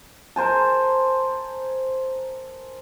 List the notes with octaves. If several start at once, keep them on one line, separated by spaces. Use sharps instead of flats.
A#4 C5 G#5 A5